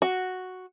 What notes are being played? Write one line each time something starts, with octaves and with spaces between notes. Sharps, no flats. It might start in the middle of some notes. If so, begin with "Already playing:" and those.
F#4